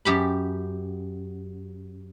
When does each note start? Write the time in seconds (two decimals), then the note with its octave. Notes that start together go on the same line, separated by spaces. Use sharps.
0.05 F#2 G4 B5